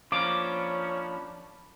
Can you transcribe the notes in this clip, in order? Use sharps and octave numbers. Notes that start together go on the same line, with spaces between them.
F3 A#3 C#4 D4 B5 D6